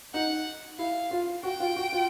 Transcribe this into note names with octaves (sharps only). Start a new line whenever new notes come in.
D#4 F#5
E4 F5
F4
F#4 G5
F4
F#4
F4